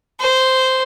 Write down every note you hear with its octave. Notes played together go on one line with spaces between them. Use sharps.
C5